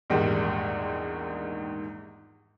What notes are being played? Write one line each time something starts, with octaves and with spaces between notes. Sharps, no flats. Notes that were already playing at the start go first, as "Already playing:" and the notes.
A#1 E2 G#2 D#3 G3